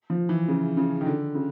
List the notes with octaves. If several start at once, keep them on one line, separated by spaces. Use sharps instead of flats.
F3
E3
C#3
C#3
D#3
D3
C#3